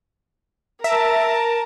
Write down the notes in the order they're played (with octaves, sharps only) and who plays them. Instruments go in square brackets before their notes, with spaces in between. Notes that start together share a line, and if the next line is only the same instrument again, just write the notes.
[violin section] A#4 A5 [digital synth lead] E5